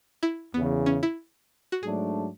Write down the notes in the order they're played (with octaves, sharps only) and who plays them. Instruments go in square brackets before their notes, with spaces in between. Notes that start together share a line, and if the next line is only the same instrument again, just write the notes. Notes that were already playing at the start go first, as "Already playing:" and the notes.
[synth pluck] E4
[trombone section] E2 C#3 E3 [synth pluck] B3
[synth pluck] C#4
E4
F#4
[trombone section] G#2 F#3 A3 D4 [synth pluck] G#4